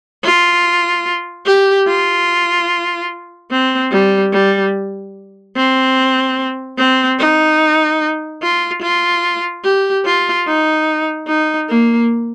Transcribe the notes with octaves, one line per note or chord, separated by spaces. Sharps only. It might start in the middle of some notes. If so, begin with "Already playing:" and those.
F4
G4
F4
C4
G3
G3
C4
C4
D#4
F4
F4
G4
F4
D#4
D#4
A#3